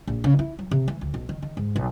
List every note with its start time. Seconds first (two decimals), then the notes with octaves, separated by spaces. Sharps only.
0.07 A#1
0.24 C#3
0.39 E4
0.59 F#3
0.71 C3
0.88 E3
1.01 D2
1.14 B1
1.29 D#3
1.42 D#3
1.57 G#2
1.76 B1